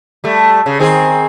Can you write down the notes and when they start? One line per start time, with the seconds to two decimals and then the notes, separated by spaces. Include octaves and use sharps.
0.24 G3 A3
0.66 C#3
0.80 D#3 C4 G#4